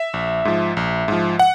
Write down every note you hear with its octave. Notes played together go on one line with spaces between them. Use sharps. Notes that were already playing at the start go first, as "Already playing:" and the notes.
Already playing: E5
A#1
G#2 F3
A#1
G#2 F3
F#5